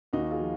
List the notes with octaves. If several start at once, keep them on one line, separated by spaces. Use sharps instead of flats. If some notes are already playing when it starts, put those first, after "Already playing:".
D#2 D#4 F#4
F#4
F4 G#4
F3